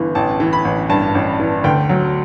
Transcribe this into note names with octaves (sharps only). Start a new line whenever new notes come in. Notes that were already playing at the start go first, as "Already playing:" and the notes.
Already playing: G1 E3
A1 A5
E3
B5
A1
G2 A5
A1
E3
D2 G5
F#3